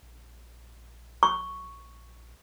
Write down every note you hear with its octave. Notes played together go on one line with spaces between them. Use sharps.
A#1
C#6